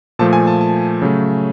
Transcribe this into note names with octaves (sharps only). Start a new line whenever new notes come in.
A#2 F3 A3 A5
G#5
A5
A5
C#3 F#3 A3